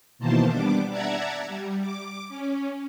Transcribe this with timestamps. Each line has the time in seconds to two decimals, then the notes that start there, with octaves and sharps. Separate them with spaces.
0.19 B2 D#3 E3 A#3 C5 A5
0.50 G3 B3 D4 D6
0.90 D5 E5 F#5 A5 A#5 G#6
1.48 G3
1.80 D6
2.29 C#4